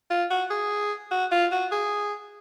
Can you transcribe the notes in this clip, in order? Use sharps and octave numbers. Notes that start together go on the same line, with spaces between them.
F4
F#4
G#4
F#4
F4
F#4
G#4